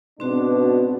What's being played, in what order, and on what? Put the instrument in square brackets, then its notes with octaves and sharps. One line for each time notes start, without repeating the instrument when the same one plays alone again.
[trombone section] G#2 B2 D4 [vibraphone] C4 F#4